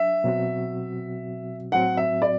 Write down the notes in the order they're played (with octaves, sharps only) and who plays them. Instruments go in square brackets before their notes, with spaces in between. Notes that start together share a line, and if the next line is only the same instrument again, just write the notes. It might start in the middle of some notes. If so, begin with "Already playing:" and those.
Already playing: [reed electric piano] F#3 D4 [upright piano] E5
[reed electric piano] B2 F#3 C4 F#4
[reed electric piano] A2 F#3 C4 F#4 [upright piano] F#5
[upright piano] E5
D5